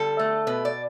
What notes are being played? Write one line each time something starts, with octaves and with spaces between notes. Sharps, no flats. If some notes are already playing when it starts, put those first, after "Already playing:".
Already playing: D3 G3 A4
A3
B2 B4
D5